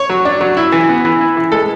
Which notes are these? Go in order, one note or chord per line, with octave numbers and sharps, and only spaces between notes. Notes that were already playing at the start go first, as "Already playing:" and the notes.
Already playing: C#5
F#3
D4
F#3
E4
E3
B3
E3
E4
E3
G#3 A4